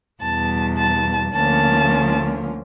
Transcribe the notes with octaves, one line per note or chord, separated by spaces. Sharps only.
E2 B2 G3 A5
A5
D2 D3 F3 A#3 C#4 A5